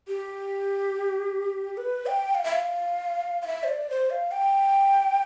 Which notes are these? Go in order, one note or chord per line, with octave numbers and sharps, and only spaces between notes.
G4
B4
G5
F5
E5
F5
F5
E5
C5
D5
C5
F5
G5